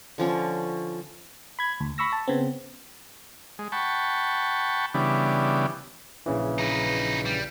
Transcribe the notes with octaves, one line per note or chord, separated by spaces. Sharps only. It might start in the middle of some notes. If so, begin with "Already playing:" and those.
D3 F3 C#4
B5 G#6
D2
B5 C#6 E6 A#6
A5
C#3 B3 C4
G#3
F#5 G5 A5 B5 C#6
C#3 E3 G3 B3 D4
A#1 C#3 E3
D#4 B4
G3